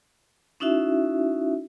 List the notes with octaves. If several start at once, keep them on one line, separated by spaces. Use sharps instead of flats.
C#4 D#4 E4 F#4 E5